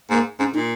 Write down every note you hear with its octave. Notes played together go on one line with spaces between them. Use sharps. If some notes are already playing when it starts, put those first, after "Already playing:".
G#2 A#3
G#2 C#4
A#2 D#4